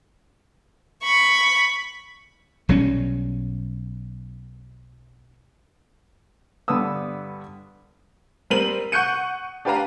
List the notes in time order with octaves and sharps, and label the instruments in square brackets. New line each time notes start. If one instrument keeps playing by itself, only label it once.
[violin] B5 C#6
[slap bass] B1 F#3 G3 C#4
[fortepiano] G2 D3 B3 B4 D#6 E6
[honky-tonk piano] G3 C4 A#4 D#7 F#7
F#5 C#6 F#6 G6 C#7 D#7
D4 G4 B4 F5 A#5